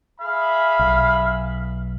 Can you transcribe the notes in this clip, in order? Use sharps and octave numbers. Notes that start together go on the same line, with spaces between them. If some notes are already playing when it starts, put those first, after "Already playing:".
G#4 E5 F5 B5
B1